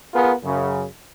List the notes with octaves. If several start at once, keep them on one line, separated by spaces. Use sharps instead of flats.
B3 F4 G#4 A#4
F#2 C#3